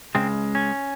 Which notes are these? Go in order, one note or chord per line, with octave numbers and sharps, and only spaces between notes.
C#2 C#3 G#3 C4
C#4